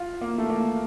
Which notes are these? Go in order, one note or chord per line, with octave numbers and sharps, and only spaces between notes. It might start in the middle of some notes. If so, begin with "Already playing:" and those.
Already playing: F4
A#3
A3
A#3